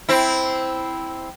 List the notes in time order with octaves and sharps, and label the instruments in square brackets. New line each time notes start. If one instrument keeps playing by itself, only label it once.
[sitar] C4 E4